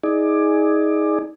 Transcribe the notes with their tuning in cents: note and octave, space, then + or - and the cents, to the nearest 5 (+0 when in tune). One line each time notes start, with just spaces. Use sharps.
D#4 +35 G#4 +5 D5 +20